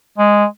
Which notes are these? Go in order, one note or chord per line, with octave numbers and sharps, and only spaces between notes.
G#3